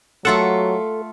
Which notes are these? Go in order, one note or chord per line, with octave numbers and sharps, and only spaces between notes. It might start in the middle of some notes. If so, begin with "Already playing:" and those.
F#3 A3 F4 A4 F#5